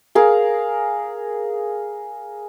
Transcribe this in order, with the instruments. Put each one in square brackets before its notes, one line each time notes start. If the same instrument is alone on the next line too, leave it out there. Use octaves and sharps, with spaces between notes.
[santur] G#4 A#4 F5